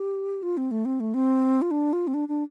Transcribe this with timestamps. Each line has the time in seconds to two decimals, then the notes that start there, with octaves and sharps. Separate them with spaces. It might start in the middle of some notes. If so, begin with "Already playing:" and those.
Already playing: G4
0.43 F4
0.57 C4
0.71 A3
0.85 C4
1.00 A3
1.14 C4
1.62 F4
1.71 D4
1.93 F4
2.07 C4
2.14 D4
2.28 D4